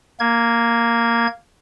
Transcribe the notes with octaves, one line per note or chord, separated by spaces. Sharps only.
A#3 G#6